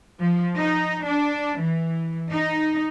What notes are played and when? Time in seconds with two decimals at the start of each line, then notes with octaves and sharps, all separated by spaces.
0.20 F3
0.58 D#4
1.06 D4
1.61 E3
2.32 D#4